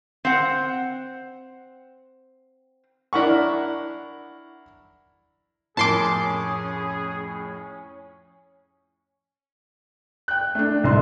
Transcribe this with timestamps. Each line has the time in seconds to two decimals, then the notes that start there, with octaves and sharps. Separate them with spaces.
0.25 C4 F#5
3.13 D4 E4 A#4 F#5 C#6
5.77 F2 A2 C#4 G#4 A#4 A5 C6 D6
10.28 G5 F#6
10.55 A3 D4
10.84 C2 G#2 C6